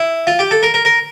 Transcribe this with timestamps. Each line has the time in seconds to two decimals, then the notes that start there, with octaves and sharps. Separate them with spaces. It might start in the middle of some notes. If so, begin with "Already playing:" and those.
Already playing: E4
0.27 F4
0.39 G4
0.51 A4
0.63 A#4
0.74 A#4
0.85 A#4